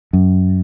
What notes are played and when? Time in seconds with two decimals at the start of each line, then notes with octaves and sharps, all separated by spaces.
0.13 F#2